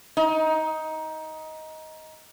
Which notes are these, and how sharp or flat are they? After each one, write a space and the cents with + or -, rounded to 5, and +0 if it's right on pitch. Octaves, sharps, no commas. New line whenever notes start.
D#4 +15